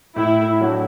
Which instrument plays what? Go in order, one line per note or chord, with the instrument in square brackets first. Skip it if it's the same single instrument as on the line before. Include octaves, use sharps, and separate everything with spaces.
[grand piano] A2 [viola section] E4
[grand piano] F#3 A3 D4 F#4